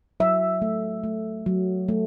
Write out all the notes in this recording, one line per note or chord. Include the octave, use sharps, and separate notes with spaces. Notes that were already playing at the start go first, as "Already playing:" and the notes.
F#3 E5
A3
A3
F#3
A3